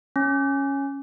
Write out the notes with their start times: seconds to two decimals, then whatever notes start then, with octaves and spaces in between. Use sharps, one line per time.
0.16 C#4